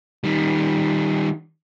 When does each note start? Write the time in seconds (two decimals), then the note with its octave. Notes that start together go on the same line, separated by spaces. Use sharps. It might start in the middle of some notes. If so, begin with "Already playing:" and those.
0.24 D#3 G3